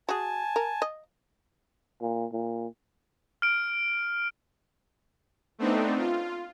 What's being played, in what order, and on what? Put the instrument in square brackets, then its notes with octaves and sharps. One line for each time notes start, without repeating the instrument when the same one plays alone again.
[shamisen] F#4 G#4 [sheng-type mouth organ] G#5 A5
[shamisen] A#4
D#5
[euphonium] A#2
A#2
[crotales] F6 D7
[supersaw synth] A3 B3 C4 D4 D#4
F4